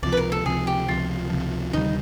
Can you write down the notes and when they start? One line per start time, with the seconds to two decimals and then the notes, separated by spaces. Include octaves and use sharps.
0.02 C#2 C3 F3 D5
0.12 B4
0.17 A#4
0.32 A4
0.45 C#2 C3 F3 G#4
0.67 G4
0.88 C#2 C3 F3 F4
1.30 C#2 C3 F3
1.73 D2 C3 D#3 G3 D#4